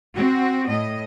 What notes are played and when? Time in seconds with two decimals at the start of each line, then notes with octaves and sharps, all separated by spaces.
0.18 C4 F#4
0.69 A2 D#5